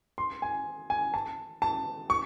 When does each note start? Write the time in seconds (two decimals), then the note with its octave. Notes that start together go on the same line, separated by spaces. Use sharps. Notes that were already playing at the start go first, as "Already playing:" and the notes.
0.18 C6
0.42 G#5
0.90 G#5
1.14 A5
1.62 A5
2.10 C#6